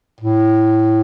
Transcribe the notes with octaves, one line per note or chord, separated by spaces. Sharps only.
A2